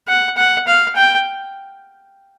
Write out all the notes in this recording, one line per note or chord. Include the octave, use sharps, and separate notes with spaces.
F#5
F#5
F5
G5